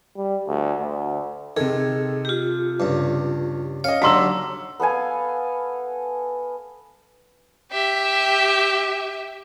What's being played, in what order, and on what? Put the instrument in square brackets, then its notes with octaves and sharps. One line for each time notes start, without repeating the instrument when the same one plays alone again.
[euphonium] G3
D2
D2
[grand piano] C3 A4 [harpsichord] D#3 [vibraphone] G#4
[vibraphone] F4 G4
[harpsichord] C#2 G2
[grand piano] C#4 D#5 [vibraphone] C#5 [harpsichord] F5
[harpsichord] D#2 D3 [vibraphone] F#3 D4 [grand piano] F#4 [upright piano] A#5 C6 E6
[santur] B3 A4 F5 G#5
[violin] G4 E5